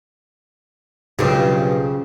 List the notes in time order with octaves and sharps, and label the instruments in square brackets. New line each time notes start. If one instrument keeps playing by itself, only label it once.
[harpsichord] B1 G2 [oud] C#3 F3 C4